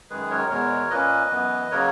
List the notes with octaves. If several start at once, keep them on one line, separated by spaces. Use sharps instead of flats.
F#2 D#3 G#3 G#4 B4
A#4 C#5
E2 B2 G#3 A#4 C#5
A#2 A#3 C#4 B4 D#5
F#2 E3 B3
C#3 F#3 A#3 A#4 C#5